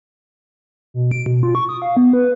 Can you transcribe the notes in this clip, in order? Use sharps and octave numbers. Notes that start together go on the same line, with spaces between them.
B2
D7
B2
F4
C#6
D#6
F5
B3
B4